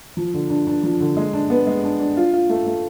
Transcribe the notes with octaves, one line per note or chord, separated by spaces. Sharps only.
F3
D3
D4
D4
F3
D3
G#3
D4
B3
G#3
D4
D4
F4
F4
A3
A3